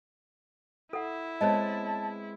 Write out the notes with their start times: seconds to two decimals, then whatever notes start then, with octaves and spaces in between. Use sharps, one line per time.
0.93 E4 A4 F#5
1.41 G#3 B3 C4 C#5 D#5 A5